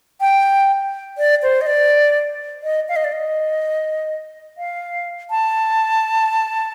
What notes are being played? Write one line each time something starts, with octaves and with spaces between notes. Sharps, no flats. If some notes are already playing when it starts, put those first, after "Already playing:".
G5
D5
C5
D#5
D5
D#5
F5
D#5
D5
D#5
F5
A5